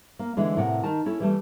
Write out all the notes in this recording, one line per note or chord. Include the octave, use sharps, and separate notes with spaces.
A#3
D3 E3 G#3
A2 C3 A#4 F#5
D#3 A#4 A5
C#4 E4 A4
E3 G3 A3